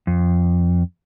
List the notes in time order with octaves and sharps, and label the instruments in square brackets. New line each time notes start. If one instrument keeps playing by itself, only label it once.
[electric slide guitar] F2